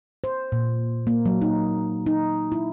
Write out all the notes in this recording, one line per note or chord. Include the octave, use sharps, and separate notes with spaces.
C5
A#2
A#3
F#3
D#4
D#4
E4